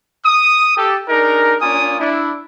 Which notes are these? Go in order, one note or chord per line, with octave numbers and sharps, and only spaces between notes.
D#6
G4 A4
D4 D#4 G#4 A#4
A#3 C#4 D4 F4 G#5 D#6
D4 E4